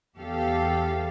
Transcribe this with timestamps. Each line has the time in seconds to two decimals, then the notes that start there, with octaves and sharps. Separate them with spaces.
0.16 E2 G4 A4 F5